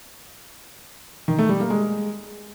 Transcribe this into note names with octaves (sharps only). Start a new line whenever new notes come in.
D#3
A3
G3
A#3
G#3